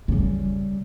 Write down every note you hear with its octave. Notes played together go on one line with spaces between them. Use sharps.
C#3 G3